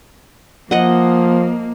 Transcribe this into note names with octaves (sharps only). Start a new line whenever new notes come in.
F3 A#3 D#5 F#5